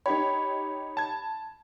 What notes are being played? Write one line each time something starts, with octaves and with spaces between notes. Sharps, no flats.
D#4 G4 C#5 B5
A5 G#6